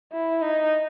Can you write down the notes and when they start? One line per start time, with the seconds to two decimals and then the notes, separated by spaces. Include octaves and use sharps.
0.12 E4
0.41 D#4